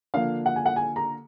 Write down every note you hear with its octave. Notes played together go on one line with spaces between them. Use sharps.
D3 F3 A#3 D4 F5
F#5
G#5
F#5
G#5
A#5